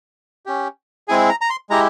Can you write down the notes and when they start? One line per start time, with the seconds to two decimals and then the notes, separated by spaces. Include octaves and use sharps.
0.46 C#4 G4
1.08 G#3 C4 E4 G#4 G#5
1.29 A#5
1.41 A#5
1.50 C6
1.70 G#3 E4 G4 A#5